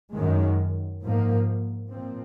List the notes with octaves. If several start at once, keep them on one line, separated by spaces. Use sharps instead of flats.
F#2 D#3 G#3
G#2 F3 A#3
A#2 F3 C4